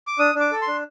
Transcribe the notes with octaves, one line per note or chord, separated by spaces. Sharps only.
D6
D4 D#6
D4
D6
A4
C6
D4